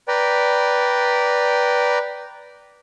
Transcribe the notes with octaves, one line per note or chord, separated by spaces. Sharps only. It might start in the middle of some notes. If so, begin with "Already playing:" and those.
B4 D5 G5 A#5